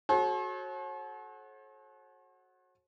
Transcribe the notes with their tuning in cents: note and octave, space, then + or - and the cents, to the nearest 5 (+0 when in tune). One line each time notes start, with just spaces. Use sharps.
F#4 +0 A4 -40 C#5 -45